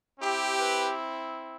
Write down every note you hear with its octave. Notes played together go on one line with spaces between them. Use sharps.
C4 E4 G4
B4